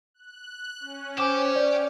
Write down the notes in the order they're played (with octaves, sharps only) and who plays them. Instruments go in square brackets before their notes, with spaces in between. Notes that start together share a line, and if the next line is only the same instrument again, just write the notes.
[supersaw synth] F#6
C#4
[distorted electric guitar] G4 G5 [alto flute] C5 [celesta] G#5 D6 E7
[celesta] D5 [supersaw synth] D6 F6 C#7